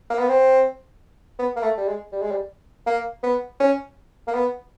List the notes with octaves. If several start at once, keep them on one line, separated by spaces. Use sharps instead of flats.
A#3
B3
C4
B3
A#3
A3
G3
G#3
G3
G#3
G3
A#3
B3
C#4
A#3
B3